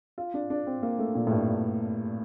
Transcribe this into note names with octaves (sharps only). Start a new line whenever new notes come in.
F4
D4
D4
C4
A#3
A3
A#2
A2
G2